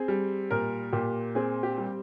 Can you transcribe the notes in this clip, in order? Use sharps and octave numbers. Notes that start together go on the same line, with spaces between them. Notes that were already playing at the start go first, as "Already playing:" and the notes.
Already playing: C4 G#4
G3
A#2 A#4
A#2 G4
C4 G#4
G4
G3